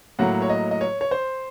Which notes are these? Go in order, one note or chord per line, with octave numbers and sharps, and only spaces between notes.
A2 F#3 A#3 F#5
C#5
D#5
D#5
C#5
C#5
C5